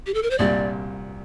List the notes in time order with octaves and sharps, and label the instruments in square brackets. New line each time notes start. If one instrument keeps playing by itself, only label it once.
[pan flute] G4
A4
A#4
C5
[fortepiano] C2 A#2 G3 [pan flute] D5